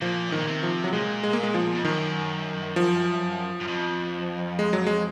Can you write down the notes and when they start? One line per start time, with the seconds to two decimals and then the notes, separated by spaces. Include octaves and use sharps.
0.01 A#2 F3
0.29 G#2 D#3
0.38 A#2
0.47 C3
0.63 F3
0.84 F#3
0.93 A#2 G#3
1.23 G#3
1.33 A#3
1.43 G#3
1.54 F3
1.75 F2
1.85 F#2 D#3
2.76 F3
3.60 F#2
3.68 F2
4.59 G#3
4.73 F#3
4.87 G#3